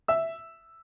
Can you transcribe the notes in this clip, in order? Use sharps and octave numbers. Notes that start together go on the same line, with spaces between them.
E5 E6